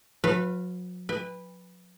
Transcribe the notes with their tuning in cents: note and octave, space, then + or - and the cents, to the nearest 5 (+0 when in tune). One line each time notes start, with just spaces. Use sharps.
F#3 -40 B4 +0 F5 -10
B4 +0 G5 +45